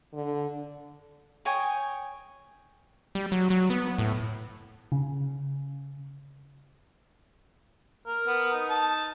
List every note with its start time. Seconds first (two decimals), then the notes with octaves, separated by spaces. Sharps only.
0.14 D3
1.45 C#5 G5 G#5 D#6
3.15 G3
3.32 F#3
3.50 F#3
3.70 B3
3.98 A2
4.92 C#3
8.07 A#4
8.27 B3
8.53 D#4
8.70 A5